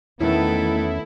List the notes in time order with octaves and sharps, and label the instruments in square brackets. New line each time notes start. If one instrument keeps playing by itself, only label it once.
[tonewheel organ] E2 C#4 [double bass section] D#3 A3 B3 [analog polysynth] E4 [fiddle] A4